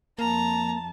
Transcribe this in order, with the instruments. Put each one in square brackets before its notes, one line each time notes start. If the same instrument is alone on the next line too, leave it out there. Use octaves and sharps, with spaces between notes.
[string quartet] F2 A5 [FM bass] A#3 [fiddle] A#5